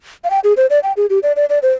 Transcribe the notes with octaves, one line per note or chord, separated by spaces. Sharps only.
F5
G5
G#4
C5
D5
G5
G#4
G4
D5
D5
D5
C5